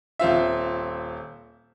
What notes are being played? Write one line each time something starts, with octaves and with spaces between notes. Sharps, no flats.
D#1 C4 F4 E5